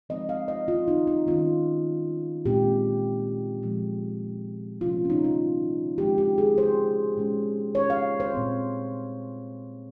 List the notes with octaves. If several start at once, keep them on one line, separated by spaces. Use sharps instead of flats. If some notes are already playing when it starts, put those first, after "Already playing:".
F3 G#3 C4 D#5
F5
D#5
F4
D#4
D#4
D#3 G3 C#4 F4
A#2 G#3 C4 G4
A#2 F3 G#3
C3 F3 A#3 C#4 F4
C#4
D#4
F4
C#3 F3 G#3 C4 G4
G4
G#4
C5
A#2 G#3 C#4
C#5
F5
C5
A#2 G3 C4